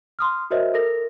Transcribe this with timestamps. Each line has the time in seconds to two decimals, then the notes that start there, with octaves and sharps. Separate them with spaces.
0.19 C6 D#6 F6
0.50 F#4 A#4 C5 C#5 D#5 E5
0.74 A4 A#4 A#6